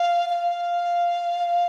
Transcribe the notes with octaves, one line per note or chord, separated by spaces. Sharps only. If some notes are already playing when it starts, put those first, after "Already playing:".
Already playing: F5
F5